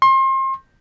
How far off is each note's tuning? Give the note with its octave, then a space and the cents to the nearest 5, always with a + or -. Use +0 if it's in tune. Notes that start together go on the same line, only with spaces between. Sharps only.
C6 +35